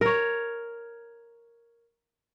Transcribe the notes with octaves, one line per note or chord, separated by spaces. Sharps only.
A#4 C#5